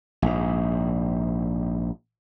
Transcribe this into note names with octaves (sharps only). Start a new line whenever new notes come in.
A#1 G#2